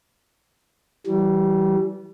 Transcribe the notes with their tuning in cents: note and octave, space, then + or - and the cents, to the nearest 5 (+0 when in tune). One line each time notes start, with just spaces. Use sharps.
E3 +0 G3 -25